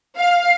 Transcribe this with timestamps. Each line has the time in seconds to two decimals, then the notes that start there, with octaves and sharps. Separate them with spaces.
0.17 F5